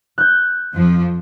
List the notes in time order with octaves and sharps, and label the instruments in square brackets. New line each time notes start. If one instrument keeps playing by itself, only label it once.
[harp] F#6 G6
[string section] F2 F3